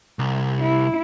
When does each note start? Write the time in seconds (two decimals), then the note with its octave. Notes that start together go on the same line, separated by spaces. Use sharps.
0.19 C2
0.60 E4